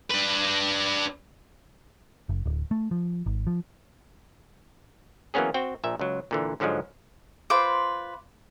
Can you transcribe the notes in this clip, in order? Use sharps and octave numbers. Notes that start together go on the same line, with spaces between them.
D4 B4
F#1
D1
A3
F3
G#1
F3
E3 F#3 A#3 B3 C#4 G#4
C4 F#4 G5
A#1 A#2 E5
C#2 F#3
A#2 D3 E3
G#2 D3 F3 F#3 G#3
F4 B4 C5 D6